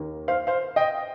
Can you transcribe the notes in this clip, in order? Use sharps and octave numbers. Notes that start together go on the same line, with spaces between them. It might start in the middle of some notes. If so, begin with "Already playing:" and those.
Already playing: D#2 D#3 A#3
C5 F5
C5 F5
D#5 G5